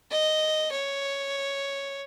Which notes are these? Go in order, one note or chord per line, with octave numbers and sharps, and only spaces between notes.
D#5
C#5